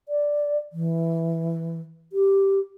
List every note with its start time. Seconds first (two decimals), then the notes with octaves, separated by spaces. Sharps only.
0.08 D5
0.72 E3
2.12 G4